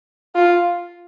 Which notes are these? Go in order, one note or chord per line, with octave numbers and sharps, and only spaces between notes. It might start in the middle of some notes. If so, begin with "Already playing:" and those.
F4